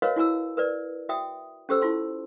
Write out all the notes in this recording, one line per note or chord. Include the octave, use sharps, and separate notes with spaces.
F#4 A#4 B4 C#5 D#5 F5
E4 F#4 G#5 A#5 E6
A#4 B4 D5
F#4 E5 G5 D#6
C#4 F#4 G4 A4 C5 E6
E4 F4 A5 C6